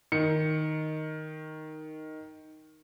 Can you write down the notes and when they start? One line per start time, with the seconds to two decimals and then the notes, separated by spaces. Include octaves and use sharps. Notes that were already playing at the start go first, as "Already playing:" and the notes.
0.12 D#3 C#7